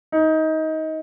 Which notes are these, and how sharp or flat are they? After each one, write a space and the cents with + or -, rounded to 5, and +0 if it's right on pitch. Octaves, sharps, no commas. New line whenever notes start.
D#4 +20